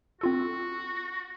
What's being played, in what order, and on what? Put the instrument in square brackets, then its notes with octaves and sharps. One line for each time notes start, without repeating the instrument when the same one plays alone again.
[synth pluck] C4 F4 A4 [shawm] F#4